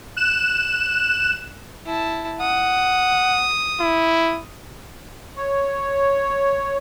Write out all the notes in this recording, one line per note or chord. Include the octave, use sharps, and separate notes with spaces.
F#6 E7
E4 A5
F#5 D#6
E4
C#5